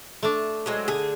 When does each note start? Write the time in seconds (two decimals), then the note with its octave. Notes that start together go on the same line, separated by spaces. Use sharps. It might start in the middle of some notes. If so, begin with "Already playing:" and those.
0.23 A3 D4
0.66 F#3 G#3 C4
0.88 D3 G#4